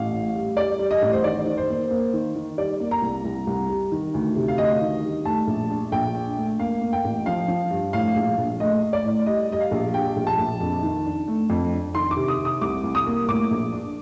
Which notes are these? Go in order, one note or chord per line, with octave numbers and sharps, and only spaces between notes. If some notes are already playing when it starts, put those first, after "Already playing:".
Already playing: A1 F5
A2
G3
G3 D5
G3
D#5
A1
C5
D#3 D5
D#3
C5
A#3
A#3
D#3
D#3
G3 D5
A#3
A#5
C2
C2
C2
G3
D#3
D2
C3
F5
D2 D#5
D#3
G3
A3 A5
A#1
D4
A#1 G5
D4
A3
A#3 F5
A#3
G5
A1
F3 F5
F3
G2
A2 F5
A#1
A#1
A3 D#5
A3
D5
A2
G3 D#5
G3 D#5
F5
A#1
G3 G5
A#1
A5
A#1
F2
D#3
D4
A3
F2
D4
D#3 C6
D6
C3
D#6
C3
D#6
C2 D6
C2
D#6
A#3
A2 D6
A#1
D4